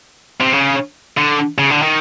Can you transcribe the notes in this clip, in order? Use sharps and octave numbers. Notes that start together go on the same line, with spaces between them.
C3
C#3
D3
C#3
D3
D#3